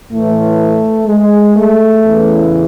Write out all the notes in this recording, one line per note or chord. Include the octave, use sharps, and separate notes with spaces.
A2 E3 A3
G#3
A3
E2 C#3 E3